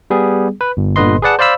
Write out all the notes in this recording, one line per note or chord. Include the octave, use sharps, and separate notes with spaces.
G3 B3 G#4
B4
G1
G1 A#2 D3 B4 D#5 C6
G#4 B4 D5 F#5 A5
C5 D5 F5 B5 E6